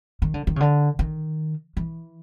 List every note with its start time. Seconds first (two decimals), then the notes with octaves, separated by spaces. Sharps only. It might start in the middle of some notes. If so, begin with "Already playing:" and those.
0.22 D#3
0.34 D3
0.47 D#3
0.56 C#3
0.60 D3
0.99 D#3
1.77 E3